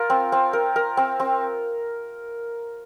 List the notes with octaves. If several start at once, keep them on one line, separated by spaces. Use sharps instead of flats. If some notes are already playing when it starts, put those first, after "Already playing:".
Already playing: F4 A#4
C4
C4
A#4
A#4
C4
C4